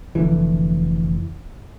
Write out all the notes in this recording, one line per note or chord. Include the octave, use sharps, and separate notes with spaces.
F1 F2 D3 E3